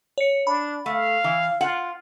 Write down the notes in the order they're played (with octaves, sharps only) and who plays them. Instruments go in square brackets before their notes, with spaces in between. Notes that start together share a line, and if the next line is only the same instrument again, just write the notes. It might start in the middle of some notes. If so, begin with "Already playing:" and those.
[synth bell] C#5 C#7
[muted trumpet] D4 [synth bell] B5
[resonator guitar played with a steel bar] A3 [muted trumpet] F5
[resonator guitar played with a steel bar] E3
[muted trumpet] F4 [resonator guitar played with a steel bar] F#5